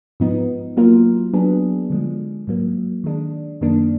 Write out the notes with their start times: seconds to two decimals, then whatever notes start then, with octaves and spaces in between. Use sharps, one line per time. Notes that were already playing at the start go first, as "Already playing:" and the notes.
0.20 G#2 F3 B3 D#4
0.77 F#3 A#3 F4 A#4
1.33 F#3 B3 D4 G#4
1.90 D3 F3 G#3
2.47 G#2 F#3 A#3
3.04 D#3 G#3 D4
3.61 F#2 D#3 A#3 D4